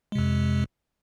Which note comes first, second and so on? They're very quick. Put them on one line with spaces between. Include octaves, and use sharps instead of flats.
G#3 C3 F2